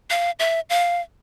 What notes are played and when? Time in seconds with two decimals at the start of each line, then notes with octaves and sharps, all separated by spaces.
0.10 F5
0.39 E5
0.70 F5